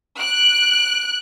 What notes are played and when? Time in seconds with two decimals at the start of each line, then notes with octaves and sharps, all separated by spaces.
0.19 F#6 D7